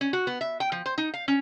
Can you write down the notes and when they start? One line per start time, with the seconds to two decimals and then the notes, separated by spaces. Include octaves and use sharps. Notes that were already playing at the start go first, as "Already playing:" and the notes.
0.01 C#4
0.13 F#4
0.27 B3
0.41 E5
0.60 G5
0.72 F3
0.86 C5
0.98 D#4
1.14 F5
1.28 C#4